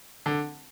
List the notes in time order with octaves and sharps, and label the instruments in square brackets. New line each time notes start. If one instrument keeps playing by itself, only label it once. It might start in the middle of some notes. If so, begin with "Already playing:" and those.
[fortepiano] D3